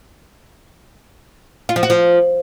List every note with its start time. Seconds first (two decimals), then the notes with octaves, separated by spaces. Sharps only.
1.69 F4
1.76 F3
1.83 F#4
1.90 F3